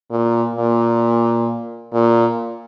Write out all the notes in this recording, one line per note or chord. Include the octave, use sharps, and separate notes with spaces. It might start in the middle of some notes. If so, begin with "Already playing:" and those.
A#2
A#2
A#2